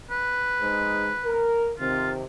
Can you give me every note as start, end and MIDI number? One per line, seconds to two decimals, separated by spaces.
0.11 1.49 71
0.61 1.12 56
0.61 1.12 63
0.61 1.12 72
1.25 1.71 70
1.80 2.24 48
1.80 2.24 51
1.80 2.24 60
1.80 2.11 65